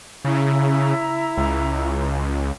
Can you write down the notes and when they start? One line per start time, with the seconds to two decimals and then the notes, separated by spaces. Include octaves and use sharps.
0.25 C#3 E4 A#5 E6
1.37 C#2